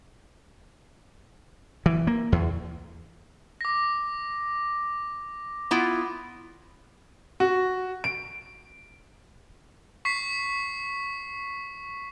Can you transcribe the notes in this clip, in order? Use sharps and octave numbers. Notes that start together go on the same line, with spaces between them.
E3
A#3
E2
D6 A#6
B3 E4 F4
F#4
D7
C#6 B6 C7